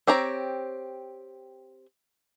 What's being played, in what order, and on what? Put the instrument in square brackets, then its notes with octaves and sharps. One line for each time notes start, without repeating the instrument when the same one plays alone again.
[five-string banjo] C4 G4 C#5 A#5